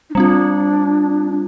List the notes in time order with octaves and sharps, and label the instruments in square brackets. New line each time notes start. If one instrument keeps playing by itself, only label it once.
[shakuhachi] D#4
[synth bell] G3 C4 F4 [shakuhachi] D4